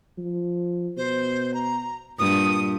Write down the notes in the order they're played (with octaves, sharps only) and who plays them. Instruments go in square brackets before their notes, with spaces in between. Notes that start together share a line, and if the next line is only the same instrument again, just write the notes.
[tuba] F3
[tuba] B2 [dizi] C5
[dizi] A#5
[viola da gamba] G2 [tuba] A#2 [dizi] D#6